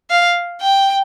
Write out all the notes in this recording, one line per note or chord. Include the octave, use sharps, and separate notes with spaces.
F5
G5